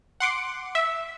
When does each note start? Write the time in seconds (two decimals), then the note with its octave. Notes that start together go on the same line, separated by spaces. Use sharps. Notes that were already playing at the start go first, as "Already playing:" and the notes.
0.20 F#5 C6 D6
0.75 E5